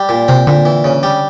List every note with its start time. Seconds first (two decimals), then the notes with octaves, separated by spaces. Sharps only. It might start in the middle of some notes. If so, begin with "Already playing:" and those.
Already playing: G3
0.09 A#2
0.28 C3 C4
0.47 A#2 D3
0.65 E3
0.84 C#3
1.03 G3